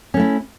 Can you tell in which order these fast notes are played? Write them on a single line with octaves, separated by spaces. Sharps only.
C#4 A3 E4